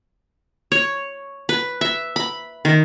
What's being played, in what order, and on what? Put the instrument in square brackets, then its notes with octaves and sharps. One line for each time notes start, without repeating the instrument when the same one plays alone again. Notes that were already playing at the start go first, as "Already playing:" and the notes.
[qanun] C#5
B4
E5
B5
D#3